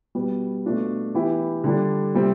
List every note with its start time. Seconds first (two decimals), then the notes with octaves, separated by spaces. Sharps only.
0.15 B2 G3 B3
0.65 B2 A3 D4 F4
1.15 E3 B3 E4 G4
1.64 D3 G3 D4
2.15 C3 G3 C4